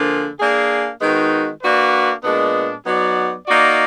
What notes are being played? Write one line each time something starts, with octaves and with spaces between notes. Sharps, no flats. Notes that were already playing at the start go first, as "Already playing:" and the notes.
Already playing: D3 F3 A#3 F4 G#4
A#3 D4 G#4
D#3 G#3 B3 D#4 F#4
A#3 D4 F#4 B4 D5
A#2 G#3 B3 D4
F#3 B3 D#4 F#4 D5
A#3 D#4 F#4 D5